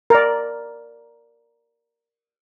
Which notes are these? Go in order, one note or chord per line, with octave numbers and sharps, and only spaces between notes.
A#4 D5